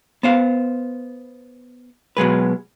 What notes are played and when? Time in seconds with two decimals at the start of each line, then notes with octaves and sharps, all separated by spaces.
0.23 B3 C5 F5
2.17 B2 F#3 G#3 B4